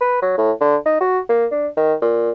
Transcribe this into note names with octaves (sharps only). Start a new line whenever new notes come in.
B4
F#3
A2
D3
D#4
F#4
A#3
D4
D#3
A#2